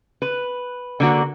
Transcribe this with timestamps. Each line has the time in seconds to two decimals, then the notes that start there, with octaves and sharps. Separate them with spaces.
0.22 B4
1.00 D3 A#3 F#4